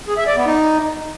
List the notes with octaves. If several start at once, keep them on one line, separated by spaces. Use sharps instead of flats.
G#4
E5
D5
B3
D#4